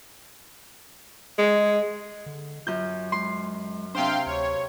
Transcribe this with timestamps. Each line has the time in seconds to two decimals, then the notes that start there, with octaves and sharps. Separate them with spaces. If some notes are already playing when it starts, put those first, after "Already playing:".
1.39 G#3
2.26 D3
2.67 F#2 F4 G6
3.12 G#3 C6
3.95 C3 D4 C5 F5 G5 C6
4.26 D2 C#5